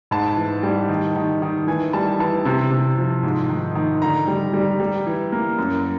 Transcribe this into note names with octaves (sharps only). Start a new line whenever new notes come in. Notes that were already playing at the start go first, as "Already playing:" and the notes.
G#2 A5
E3
G3
D#3
D#3
D#3
E3 G#5
G3 A5
E3 A5
C3
C3
F3
G#2
D#3
D#3
D3 A#5
G3
G3
G3
E3
A#3
F#2